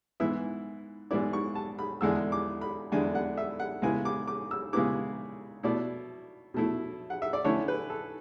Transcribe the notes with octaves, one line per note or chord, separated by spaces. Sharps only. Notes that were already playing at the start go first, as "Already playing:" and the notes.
G#2 E3 B3 E4 E5
G#2 E3 B3 E4 D5
C#6
A5
B5
E2 D3 G#3 D4 E6
D6
B5
E2 D3 G#3 D4 G#5
F#5
E5
F#5
C#3 G#3 B3 E4 G#5
D6
D6
E6
C#3 G#3 B3 E4 D6
B2 A3 E4 D5
B2 A3 E4
F#5
E5
D5
D3 A3 C#4 E4 C#5
B4
A4